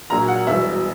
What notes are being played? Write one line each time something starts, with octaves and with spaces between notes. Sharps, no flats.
A#1 A#2 F#3 A#5
F#5
E1 E2 B2 G3 E5